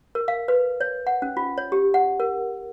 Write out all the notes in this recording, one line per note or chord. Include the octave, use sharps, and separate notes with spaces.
A#4
F5
B4
C#5
F#5
C#4
F4
C#5
G4
F#5
A#4